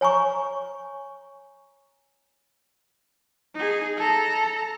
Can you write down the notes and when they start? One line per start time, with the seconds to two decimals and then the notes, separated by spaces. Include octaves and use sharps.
0.01 C#5 G#5 A#5 C#6
3.54 D#4 G#4
3.97 A4 A#5